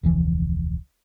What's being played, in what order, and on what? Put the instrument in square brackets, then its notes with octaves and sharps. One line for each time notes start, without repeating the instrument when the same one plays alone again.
[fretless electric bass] E1 C#2 E3 F3